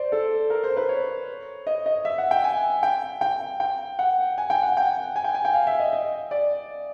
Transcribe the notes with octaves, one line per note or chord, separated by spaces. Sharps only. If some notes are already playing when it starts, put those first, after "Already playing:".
Already playing: C5 D5
A4
A#4
C5
B4
C#5
D#5
D#5
E5
F#5
G5
G#5
G5
G5
G5
F#5
G#5
G5
F#5
G5
G#5
G5
G#5
G5
F5
E5
D#5
D#5
D5